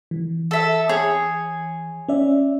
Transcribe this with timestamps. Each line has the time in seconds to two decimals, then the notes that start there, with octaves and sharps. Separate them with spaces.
0.11 E3
0.51 A4 E5
0.89 G#4 C#5
2.08 C#4 D5 E5